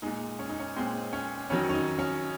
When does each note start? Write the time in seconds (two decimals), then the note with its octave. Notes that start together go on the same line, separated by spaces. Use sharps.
0.02 A#2 G#3 D#4
0.39 C#4
0.49 D#4
0.60 C#4
0.76 A#2 G#3 C4
1.13 C#4
1.50 F2 D#3 F#3 C#4
1.69 C#4
1.74 D#4
1.99 C#4